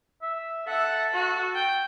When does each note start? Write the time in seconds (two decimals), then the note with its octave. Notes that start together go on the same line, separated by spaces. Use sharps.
0.22 E5
0.67 A4 E5 F#5
1.13 F#4
1.55 G5